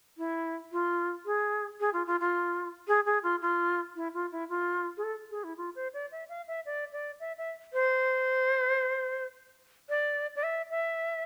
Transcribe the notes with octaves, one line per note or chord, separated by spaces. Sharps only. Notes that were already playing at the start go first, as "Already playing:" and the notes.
E4
F4
G#4
G#4
F4
F4
F4
G#4
G#4
F4
F4
E4
F4
E4
F4
G#4
A4
G#4
E4
F4
C5
D5
E5
F5
E5
D5
D5
E5
E5
C5
D5
D5
E5
E5